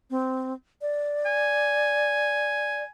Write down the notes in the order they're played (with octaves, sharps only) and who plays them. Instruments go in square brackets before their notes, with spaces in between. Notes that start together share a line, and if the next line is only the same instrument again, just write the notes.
[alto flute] C4
D5
[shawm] G#5